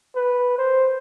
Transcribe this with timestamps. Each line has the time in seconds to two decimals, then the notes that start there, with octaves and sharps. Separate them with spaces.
0.15 B4
0.58 C5